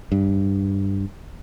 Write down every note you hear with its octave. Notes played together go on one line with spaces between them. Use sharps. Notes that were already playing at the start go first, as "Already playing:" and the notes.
G2